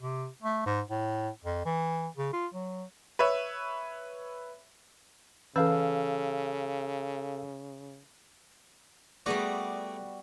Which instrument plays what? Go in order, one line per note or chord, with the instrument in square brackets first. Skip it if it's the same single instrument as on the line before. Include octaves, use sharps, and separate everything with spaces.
[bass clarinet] C3
A3
G#2
A2
F2
E3
C#3
F4
F#3
[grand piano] B4 C#5 E5
[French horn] C#3 [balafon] E3 C#4 B4 [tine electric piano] A4 F5 E6
[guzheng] G3 B3 F#4 [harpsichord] A3 G#4 D5